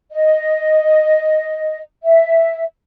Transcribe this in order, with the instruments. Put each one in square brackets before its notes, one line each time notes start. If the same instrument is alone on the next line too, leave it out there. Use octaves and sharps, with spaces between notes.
[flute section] D#5
E5